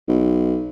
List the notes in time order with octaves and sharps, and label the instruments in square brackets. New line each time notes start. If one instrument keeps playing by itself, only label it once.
[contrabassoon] B1